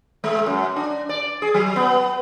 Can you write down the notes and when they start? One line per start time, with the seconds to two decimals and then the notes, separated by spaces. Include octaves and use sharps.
0.24 G#3
0.46 F#2
0.76 D4
1.09 D5
1.42 G#4
1.54 F#3
1.76 B3